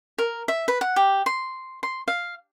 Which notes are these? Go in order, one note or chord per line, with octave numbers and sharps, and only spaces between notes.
A#4
E5
B4
F#5
G4
C6
C6
F5